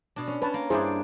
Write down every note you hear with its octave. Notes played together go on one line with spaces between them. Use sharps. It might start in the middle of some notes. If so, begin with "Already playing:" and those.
B2 D4
C#4
C#4 B4 A5
A#3
G2 D4 E4 G#4 C5 D5